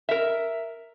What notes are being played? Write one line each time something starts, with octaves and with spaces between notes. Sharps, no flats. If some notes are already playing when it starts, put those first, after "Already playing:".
A#4 E5